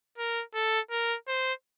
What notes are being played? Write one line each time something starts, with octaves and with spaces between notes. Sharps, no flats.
A#4
A4
A#4
C5